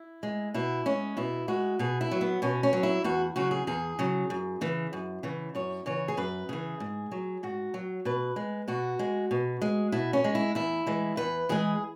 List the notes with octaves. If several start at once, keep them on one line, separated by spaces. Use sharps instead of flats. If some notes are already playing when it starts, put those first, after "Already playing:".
Already playing: E4
G#3
B2 E4
G#3 C#4
B2 E4
G#3 F#4
B2 G#4
E4
F#3
B3
B2 C#4
C#4
F#3
E4
E2 F#4
C#3 F#3 F#4
G#4
E2 G#4
C#3 F#3
F#2
C#3 E3
F#2
C#3 E3
F#2 C#5
C#3 E3 C#5
G#4
F#2 B4
C#3 E3 G#4
G#2
F#3
G#2 F#4
F#3
B2 B4
G#3
B2 F#4
G#3
B2
G#3
B2 E4
C#4
G#3
E4
E2 E4
E3 G#3
E2 B4
E3 G#3 G#4